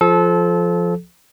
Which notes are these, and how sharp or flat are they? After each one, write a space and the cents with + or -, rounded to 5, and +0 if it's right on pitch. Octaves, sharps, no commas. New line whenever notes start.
F3 +0 A4 -25